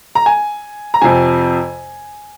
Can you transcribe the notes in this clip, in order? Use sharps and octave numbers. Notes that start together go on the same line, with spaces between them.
A#5
G#5
A#5
F2 C3 F3 G#5